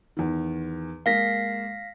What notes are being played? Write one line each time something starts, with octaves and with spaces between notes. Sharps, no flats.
E2 D#3
G#3 A#3 F5 A#6 B6